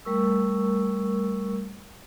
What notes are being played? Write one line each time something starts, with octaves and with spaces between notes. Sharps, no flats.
G3 A3 A#4 C#6 E6